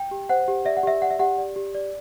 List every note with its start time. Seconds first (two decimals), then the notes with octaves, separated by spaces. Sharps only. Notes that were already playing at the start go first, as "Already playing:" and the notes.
Already playing: G5
0.11 G4
0.29 C5 F#5
0.48 G4
0.65 D5 E5
0.77 F#5
0.83 G4 E5
1.02 D5 F#5
1.11 E5
1.19 G4 F#5
1.38 D5
1.56 G4
1.75 D5